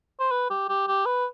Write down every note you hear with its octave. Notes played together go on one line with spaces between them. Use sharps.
C5
B4
G4
G4
G4
B4